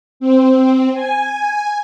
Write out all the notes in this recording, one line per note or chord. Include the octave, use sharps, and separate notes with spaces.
C4
G#5